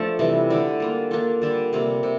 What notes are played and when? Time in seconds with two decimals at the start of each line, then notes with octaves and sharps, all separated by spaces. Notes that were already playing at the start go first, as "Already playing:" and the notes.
Already playing: F3 A3 D4 A4
0.19 C3 E3 G3
0.50 D3 A3 E4 G4
0.80 G3 A#3 F4
1.11 A#3 D4 F4 A4
1.42 D3 G3 D4
1.73 C3 G3 A#3
2.03 C3